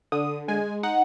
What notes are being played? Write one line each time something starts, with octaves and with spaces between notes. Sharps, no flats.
D3 D#6
G#3 G#5
D#4 F#5